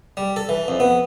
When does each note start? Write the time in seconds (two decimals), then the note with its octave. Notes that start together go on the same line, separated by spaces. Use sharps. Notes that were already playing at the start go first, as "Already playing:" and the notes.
0.17 G3
0.36 A4
0.49 E3
0.68 F2
0.80 B3